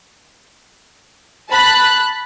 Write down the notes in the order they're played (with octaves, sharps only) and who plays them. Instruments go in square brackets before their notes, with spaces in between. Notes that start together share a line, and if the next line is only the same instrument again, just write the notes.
[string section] A5 B5 F#6